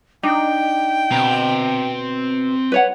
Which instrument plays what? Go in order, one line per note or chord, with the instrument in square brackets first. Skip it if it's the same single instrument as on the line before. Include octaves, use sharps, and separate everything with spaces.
[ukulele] D4 [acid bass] D#4 [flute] G5
[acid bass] B2 [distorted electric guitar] C4 A#5
[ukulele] B4 C#5 F#5